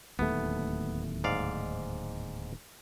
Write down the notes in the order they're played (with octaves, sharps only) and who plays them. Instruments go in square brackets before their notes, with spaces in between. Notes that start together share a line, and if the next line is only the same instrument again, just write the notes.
[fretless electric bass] D1 D#2 A3 [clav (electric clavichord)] B3
[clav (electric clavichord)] G#2 D5 F5